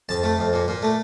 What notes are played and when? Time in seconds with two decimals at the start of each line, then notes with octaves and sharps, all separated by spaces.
0.09 F2 A5
0.23 A3
0.38 F2
0.53 A#2
0.68 A#2
0.83 A3